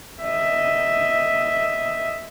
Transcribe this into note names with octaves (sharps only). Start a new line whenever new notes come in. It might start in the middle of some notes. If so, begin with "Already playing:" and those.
D#5 E5